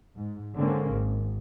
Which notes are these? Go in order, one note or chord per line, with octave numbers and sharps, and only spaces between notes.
G#2
D3 G#3 A#3 C4 C#4
G#1